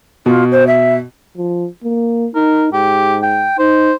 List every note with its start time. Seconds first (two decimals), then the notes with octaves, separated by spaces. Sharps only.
0.26 B2 F4
0.51 C5
0.67 E5
1.38 F3
1.84 A#3
2.35 D#4 A#4
2.73 G#2 G4
3.23 G5
3.59 D#4 C5